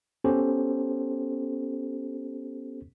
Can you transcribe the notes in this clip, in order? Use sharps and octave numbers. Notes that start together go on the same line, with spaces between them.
B3 C#4 G4 A4 C5